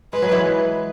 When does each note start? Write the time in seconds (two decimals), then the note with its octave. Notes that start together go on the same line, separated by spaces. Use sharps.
0.13 G#3 B4
0.22 F#3
0.32 E3 G#3